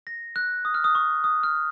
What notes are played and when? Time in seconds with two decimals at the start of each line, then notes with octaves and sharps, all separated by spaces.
0.07 A#6
0.36 F#6
0.65 D#6
0.74 F6
0.84 D#6
0.95 C#6
1.24 D#6
1.43 F6